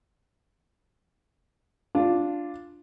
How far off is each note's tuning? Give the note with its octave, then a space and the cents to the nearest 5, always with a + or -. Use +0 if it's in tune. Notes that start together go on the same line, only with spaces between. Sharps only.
D4 +0 F4 +0